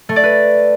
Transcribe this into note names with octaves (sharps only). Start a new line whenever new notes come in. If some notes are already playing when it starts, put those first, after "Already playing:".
A3
D5
B4